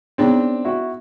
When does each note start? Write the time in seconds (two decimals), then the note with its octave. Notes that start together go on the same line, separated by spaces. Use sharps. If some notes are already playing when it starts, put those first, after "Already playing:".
0.18 B3 C4 D4 D#4 G#4 C#5
0.65 E4 F#4